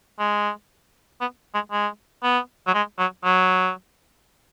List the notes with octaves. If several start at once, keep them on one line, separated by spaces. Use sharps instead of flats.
G#3
B3
G#3
G#3
B3
F#3
G#3
F#3
F#3